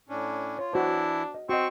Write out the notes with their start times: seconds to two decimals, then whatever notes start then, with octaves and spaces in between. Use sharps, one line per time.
0.09 A2 C#4 D4
0.59 F4 C#5
0.73 E3 D4 E4 F#4 C5
1.35 D#5
1.49 C4 F#4 D#5 C#6